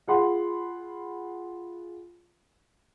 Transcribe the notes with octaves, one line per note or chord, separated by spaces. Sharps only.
F4 G#4 F#5 B5 C6